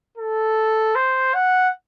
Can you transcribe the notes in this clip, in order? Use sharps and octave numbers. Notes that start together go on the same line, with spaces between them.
A4
C5
F#5